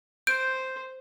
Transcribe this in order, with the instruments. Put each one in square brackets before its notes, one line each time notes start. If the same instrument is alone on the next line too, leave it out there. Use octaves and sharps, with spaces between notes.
[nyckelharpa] C5 [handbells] G6 [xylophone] D7